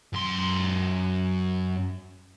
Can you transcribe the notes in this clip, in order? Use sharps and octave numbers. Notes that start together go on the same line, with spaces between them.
F#2 C6